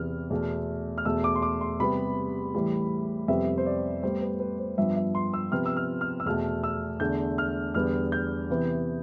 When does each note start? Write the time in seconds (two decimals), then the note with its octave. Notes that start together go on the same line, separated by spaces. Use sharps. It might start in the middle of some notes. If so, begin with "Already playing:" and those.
Already playing: E2 C3 E3 B3 F6
0.30 E2 B2 A3
0.98 F6
1.05 E2 B2 A3 E6
1.24 D6
1.35 C6
1.42 D6
1.61 C6
1.80 C3 G3 B3 B5
2.55 A2 E3 G3
3.28 F2 C3 G3 B3 E5
3.58 C5
3.66 D5
4.03 A2 G3 B3 C5
4.22 B4
4.40 B4
4.59 C5
4.78 G2 F3 B3 E5
4.96 E5
5.15 C6
5.34 E6
5.52 C3 F3 B3 F6
5.66 E6
5.77 F6
6.01 F6
6.20 E6
6.26 E2 B2 A3 F6
6.64 E6
7.00 E2 D3 A3 G6
7.38 F6
7.75 E2 D3 G3 B3 F6
8.12 G6
8.50 C3 E3 B3